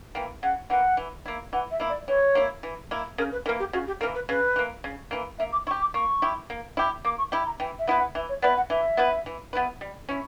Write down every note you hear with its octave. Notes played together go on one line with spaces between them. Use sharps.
E3 A#3 G5
C#3 F#5
E3 A#3 F#5
E3
A#3 E4
E3 F#5
E5
A#3 E4
D5
E3 C#5
A#3 E4
E3
A#3 E4
C#3 A#4
B4
E3 A#3 A#4
G4
C#3 F#4
G4
E3 A#3 A#4
B4
C#3 B4
E3 A#3
C#3
E3 A#3
A#3 E5
D6
E4 C#6
G4
D6
A#3 C#6
E4 G4
A#3
E4 G4
A#3 D6
C#6
E4 G4 B5
A#5
E3 G5
E5
B3 E4 B4
F#5
E3 E5
C#5
B3 E4 B4 D5
F#5
E3 E5
B3 E4 B4
E3
B3 E4 B4
G3
C#4 E4